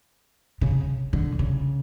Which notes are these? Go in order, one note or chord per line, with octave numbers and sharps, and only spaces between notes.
C#3
D3
C#3